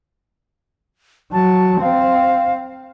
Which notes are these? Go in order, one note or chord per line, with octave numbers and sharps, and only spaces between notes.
F#3 A5
C4 F5